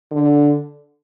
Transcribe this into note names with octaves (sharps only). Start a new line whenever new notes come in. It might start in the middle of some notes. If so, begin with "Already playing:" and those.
D3